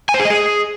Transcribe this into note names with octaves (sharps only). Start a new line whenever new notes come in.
G#5
C5
G#4
D#5
G#4